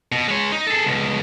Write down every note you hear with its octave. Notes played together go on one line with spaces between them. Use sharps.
B2
G#3 C#5
D#4
G#4 A4
C#2 B2